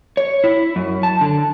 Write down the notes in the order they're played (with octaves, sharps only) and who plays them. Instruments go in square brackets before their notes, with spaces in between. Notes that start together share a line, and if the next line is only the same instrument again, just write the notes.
[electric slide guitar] C#5
E4
F#2
A5
D3